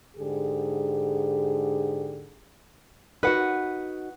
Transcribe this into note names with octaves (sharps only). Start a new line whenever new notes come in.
G#2 D3 G4 G#4
D#4 F#4 B4 F#5